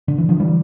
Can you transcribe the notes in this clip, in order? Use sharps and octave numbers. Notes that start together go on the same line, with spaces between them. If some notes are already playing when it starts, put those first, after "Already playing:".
D3
E3
D3 F3
E3 G3